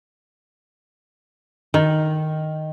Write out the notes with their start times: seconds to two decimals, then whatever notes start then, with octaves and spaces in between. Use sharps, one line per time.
1.74 D#3